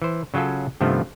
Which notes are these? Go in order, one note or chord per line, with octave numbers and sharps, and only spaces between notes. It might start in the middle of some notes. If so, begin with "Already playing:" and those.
E3 C5
C#3 F#3 C#4 F4 A4
G2 C3 D#3 F3 A3 B3